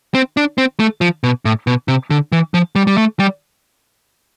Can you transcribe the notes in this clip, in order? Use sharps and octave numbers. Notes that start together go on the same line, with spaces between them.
C4
D4
C4
A3
F3
B2
A2
B2
C3
D3
E3
F3
G3
G3
A3
G3